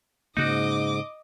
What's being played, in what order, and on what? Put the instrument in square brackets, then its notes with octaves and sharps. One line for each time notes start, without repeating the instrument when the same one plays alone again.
[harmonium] G#2 [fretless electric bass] C#3 A#3 [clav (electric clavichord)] D#4 F#4 [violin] D#5 D6